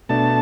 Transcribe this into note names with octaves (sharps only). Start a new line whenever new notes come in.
B2 A3 D4 A5